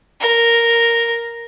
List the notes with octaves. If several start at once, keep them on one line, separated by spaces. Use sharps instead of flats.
A#4